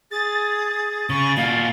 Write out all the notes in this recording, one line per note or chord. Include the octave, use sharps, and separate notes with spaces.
G#4 A6
C#3 C#6
A#2 F#4 F5